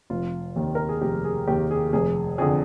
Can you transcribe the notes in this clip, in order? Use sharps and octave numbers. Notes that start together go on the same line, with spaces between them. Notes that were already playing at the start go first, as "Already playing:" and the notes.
F1 F4
D#2 D#3
A#4
G#4
F1 G4
G#4
D#2 D#3 G4
G#4
F1 G#4
F2 D3 G#4